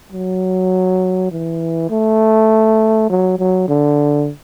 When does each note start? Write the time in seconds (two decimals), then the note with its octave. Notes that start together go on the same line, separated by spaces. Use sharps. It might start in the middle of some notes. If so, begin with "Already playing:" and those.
0.12 F#3
1.31 E3
1.90 A3
3.10 F#3
3.39 F#3
3.68 D3